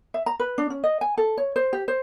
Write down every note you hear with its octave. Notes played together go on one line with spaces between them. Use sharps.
E5
A#5
B4
D4
C#4
D#5
G#5
A4
C#5
C5
G4
C5